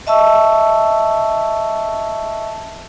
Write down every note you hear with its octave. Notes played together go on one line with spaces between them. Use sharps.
D#5 E5 A5 C#6 E6